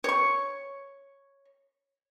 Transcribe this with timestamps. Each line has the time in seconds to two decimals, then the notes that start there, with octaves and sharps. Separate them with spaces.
0.04 C#5 C#6